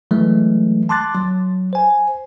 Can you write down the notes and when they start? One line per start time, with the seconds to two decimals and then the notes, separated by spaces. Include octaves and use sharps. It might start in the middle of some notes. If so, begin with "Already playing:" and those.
0.11 E3 F#3 G#3 A3
0.89 A5 C6 D6 F#6 A6
1.14 F#3
1.73 C5 G#5